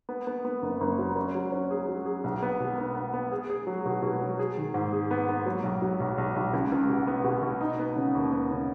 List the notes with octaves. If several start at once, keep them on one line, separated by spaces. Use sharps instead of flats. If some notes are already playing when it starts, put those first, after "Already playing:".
B3
B3
B3
F#1
F#1
F#3
C#4
F#3
C#4
G#4
F#3
G#4
B1
B3
B2
B3
B3
B3
G#4
G#4
F#3
B2
B2
F#3
G#4
D#3
G#2
G#4
B3
B3
F#3
B1
F#3
B1
B1
B1
C#2
C#2
B2
B3
B2
B2
D#4
B3
C#3
D#2
B3
C#3